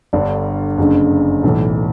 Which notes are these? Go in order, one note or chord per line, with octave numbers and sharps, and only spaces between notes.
G1 G2 D3 D5
F#1 F#2 D3
B1 A2 E3